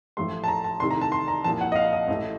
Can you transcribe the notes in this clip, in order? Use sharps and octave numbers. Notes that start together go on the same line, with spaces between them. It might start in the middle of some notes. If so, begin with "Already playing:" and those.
A1 A2 F3 A3 C6
A5
A#5
A5
C2 C3 D#3 A3 C6
A#5
A5
C6
A#5
C2 A#2 F3 A5
F#5
D#5
F5
D#5
A1 A2 A3